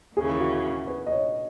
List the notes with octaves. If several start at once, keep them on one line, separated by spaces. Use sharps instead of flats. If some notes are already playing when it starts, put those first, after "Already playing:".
D#2 C#3 E3 G#4
F#4
B4
D#5
C#5